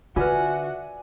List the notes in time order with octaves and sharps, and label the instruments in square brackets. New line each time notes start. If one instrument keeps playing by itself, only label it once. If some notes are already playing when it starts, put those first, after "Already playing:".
[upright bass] D3 [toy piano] F4 B4 [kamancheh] F#4 [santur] D5 E5 G#5